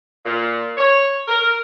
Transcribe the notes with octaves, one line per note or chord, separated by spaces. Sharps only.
A#2
C#5
A#4